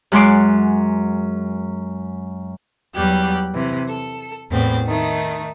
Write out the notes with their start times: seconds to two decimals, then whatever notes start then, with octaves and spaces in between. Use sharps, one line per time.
0.12 F#2 G#3 F#5 G#5 C6 D6
2.95 E2 F#3 G3 G4 F#6
3.53 C3 E3
3.87 A4
4.51 E2 A2 C4 A6
4.85 D#3 A3 D#4